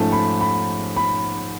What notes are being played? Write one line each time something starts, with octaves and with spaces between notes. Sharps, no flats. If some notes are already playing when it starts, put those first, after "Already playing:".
Already playing: G#2 F3 A3 C#4 A5
B5
B5
B5